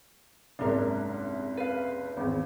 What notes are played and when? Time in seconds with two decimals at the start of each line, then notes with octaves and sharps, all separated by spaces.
0.59 F#1 C2 G#2 D4 A#4
1.57 B4 F5
2.17 G#1 E2